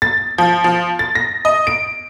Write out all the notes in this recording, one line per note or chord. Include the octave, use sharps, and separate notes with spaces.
A6
F3
F3
A6
A#6
D#5
D7